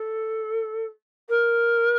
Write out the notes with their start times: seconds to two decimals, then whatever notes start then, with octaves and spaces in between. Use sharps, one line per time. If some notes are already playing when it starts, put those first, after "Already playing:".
Already playing: A4
1.29 A#4